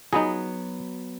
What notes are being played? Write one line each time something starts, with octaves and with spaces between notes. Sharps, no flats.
F#3 B3 D#4 G#4